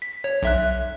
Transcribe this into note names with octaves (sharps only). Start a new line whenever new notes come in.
B6
C#5
B1 E5 F#6